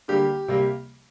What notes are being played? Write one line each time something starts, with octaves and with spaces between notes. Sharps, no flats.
D3 G3 A#3 G4
C3 G3 A#3